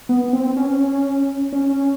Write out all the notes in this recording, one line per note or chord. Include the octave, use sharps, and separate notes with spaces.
B3
C4
C#4
C#4